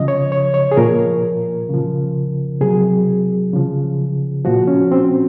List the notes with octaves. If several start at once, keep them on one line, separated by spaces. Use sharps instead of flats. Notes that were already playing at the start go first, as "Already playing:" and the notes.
Already playing: C#3 F3 D#5
C#5
C#5
C#5
G#4
A#2 F3 A#4
C#3 F3
C3 F#3 G#4
C#3 F3
A#2 F3 F#4
C#4
C4